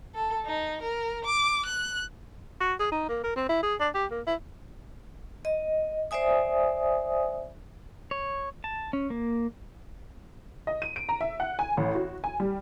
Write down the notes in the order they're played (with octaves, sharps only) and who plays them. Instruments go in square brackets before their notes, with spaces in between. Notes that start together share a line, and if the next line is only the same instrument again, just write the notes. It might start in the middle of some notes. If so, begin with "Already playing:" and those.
[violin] A4
D#4
A#4
D6
F#6
[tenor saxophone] F#4
G#4
D#4
A#3
A#4
C4
E4
G#4
D4
G4
A#3
E4
[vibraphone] D#5
C5 D5 E5 G#5 D#6
[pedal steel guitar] C#5
A5
C#4
A#3
[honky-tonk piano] D#5
D#7
D7
A#5
E5
F#5
G#5
A1
F#4
G#5
G3